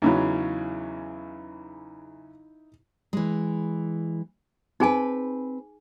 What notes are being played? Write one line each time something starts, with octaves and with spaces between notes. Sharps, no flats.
E2 C#3 F#3 D#4 E4 B5
E3 G#3
C4 D#4 G#4 B4 G#5